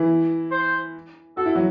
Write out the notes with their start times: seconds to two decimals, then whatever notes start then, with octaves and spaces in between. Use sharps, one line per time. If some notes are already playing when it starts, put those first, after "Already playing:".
Already playing: E3 E4
0.51 C5
1.37 F#4 A4
1.46 E4
1.55 F#3 F#4